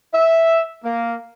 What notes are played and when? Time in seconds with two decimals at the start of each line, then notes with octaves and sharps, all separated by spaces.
0.14 E5
0.83 A#3